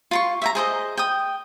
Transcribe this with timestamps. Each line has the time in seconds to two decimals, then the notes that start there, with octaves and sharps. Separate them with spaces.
0.11 F4 C6 C#6
0.42 E5 G5 A#5
0.55 G#4 C5 D#5
0.97 G5 D#6